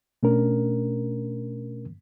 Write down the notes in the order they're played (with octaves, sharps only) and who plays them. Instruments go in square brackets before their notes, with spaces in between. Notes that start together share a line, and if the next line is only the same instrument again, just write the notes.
[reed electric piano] B2 A3 C#4 D4 A#4